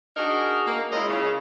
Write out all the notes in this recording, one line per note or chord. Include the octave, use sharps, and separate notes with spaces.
D4 D#4 F#4 G#4 A#4
A#3
G#3 C#4 E4 F4 D#5
C#3